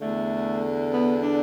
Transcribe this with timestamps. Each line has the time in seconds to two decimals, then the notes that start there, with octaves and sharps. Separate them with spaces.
0.01 E2 D3 A3
0.92 B3
1.22 D4